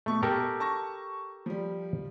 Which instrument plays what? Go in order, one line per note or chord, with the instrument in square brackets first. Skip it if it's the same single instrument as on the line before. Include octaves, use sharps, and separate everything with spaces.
[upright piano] B2 C#6 [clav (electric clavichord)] A3
[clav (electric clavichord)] G4 A4 A#4
[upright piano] A5 C#6 A#6
F3 G3